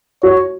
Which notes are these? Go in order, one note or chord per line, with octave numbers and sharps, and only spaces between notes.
F#4 C#5